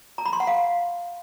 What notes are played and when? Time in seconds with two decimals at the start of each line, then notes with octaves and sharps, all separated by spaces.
0.18 A#5
0.25 B5
0.33 C6
0.40 F#5
0.47 F5